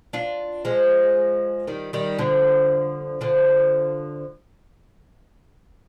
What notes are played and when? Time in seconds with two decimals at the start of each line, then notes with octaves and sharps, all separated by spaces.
0.13 D4 F4
0.65 F3 G#3
1.67 D#3 G3
1.93 D#3 G3
2.19 D3 F3
3.21 D3 F3